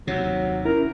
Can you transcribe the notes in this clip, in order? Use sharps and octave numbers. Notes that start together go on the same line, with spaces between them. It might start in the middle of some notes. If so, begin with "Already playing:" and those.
D#2 C3 F#3
C#4 E4 A#4